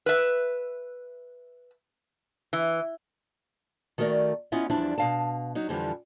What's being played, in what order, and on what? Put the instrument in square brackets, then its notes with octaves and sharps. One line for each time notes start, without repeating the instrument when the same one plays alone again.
[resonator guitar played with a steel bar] B4 E5
E3
[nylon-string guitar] D#3 A3 F#4 A#4 D5
B3 C#4 E4 F4 D#5
E2 F3 G3 D4 E4
B2 F5 A5
F#3 D#4
F2 D3 E3 F3 G3